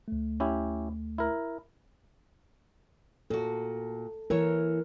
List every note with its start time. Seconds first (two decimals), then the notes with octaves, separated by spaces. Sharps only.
0.08 D2 A3
0.40 C#4 E4 G4
1.18 E4 A#4
3.30 A#2 F#4 A4
4.30 E3 E4 A#4 C#5